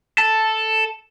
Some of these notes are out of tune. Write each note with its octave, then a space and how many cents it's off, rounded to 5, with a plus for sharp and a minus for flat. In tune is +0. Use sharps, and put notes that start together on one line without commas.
A4 +0 A5 +0